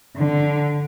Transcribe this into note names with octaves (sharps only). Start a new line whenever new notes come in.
D3